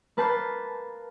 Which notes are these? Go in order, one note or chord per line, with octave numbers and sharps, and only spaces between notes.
A#3 B4 A5 G6 C7